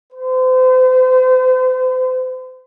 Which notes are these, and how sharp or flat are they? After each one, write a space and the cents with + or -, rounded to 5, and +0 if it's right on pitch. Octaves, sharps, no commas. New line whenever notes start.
C5 -40